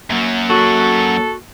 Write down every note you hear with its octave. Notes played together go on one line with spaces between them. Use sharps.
F#2 F#3 A#3
F#4 A4